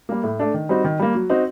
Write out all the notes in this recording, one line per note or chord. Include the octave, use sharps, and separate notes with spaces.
G3 A#3
A2
A3 D4
D#3
G3 C4 D#4 F#4
D#3
G3 A#3
F#3
C4 D#4 F#4